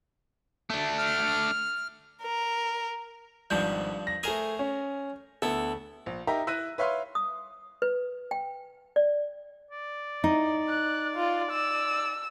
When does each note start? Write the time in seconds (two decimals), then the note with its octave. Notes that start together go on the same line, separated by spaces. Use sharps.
0.70 A3 D4
0.98 F6
2.22 A#4
3.50 G#1 G2 F3 G3 G6
4.07 A#6
4.23 A3 G#4 A#4 C5 G#5 D#7
4.59 C#4
5.42 D2 B3 E4 A4
6.06 A#1
6.27 D#4 G4 A#4 E5 A#5
6.47 E4 E5 E6 F#6 A#6 D#7
6.78 B4 C#5 E5 F5 C6 F6
7.15 D#6
7.82 B4
8.31 G5
8.96 D5
9.71 D5
10.24 D#4
10.69 F#6
11.15 F4
11.52 E6